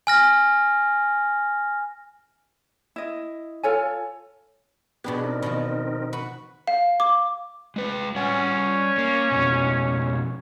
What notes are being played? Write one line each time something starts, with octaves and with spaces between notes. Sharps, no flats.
G#5 F6 A#6
E4 D#5
F4 A4 C#5 G#5
B2 B3 D4 G4 G#4 B4
C4 D#4 A#4
B2 D#3 F3
F#4 B4
F5
D6
G#3 B4
G3 C#4 F#5 G#5
A#3
F2 B2